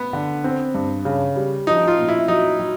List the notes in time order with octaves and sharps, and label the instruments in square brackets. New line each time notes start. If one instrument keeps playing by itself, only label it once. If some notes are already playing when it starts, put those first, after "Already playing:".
Already playing: [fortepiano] B3
[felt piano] D3
C4
G2
C#3
G3
[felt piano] F3 [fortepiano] D#4
[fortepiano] F4
[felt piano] A#2
[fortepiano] E4
[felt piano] F#3 [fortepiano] D#4
[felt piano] F#3